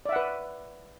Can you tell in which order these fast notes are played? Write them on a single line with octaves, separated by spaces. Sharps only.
D5 E5 F#5 B4